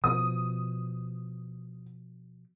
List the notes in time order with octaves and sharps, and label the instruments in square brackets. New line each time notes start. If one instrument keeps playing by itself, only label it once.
[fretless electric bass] B2 F3 [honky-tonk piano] D#6